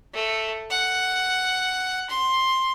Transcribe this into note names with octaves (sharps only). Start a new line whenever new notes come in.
A3
F#5
C6